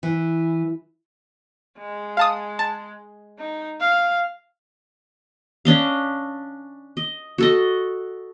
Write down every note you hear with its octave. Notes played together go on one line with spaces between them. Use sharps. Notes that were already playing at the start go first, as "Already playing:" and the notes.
E3
G#3
F5 A5 D#6
A5
D#4
F5
C#4 D4 D#5 F5
D#5
F#4 A4 D#5